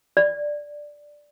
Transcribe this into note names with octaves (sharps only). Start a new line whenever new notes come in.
D5